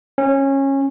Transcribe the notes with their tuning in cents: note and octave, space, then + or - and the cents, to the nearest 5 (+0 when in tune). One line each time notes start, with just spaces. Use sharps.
C#4 -20